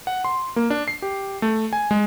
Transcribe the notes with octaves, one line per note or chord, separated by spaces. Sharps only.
F#5
C6
A#3
D4
C7
G4
A3
G#5
G#3